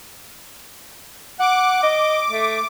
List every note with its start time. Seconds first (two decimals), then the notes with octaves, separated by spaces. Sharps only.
1.40 F#5 D6
1.83 D#5
2.30 A3